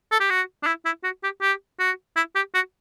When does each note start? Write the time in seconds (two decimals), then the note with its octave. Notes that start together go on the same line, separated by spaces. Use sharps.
0.11 A4
0.20 G4
0.30 F#4
0.63 D4
0.67 E4
0.85 E4
1.04 F#4
1.23 G4
1.41 G4
1.79 F#4
2.16 E4
2.35 G4
2.54 F#4